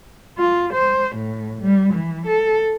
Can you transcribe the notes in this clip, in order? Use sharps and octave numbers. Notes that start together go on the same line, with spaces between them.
F4
C5
A2
G3
E3
A4